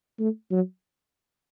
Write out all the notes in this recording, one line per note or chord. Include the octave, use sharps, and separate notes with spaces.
A3
F#3